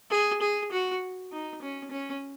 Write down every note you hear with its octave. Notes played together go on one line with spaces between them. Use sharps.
G#4
G#4
F#4
D#4
C#4
C#4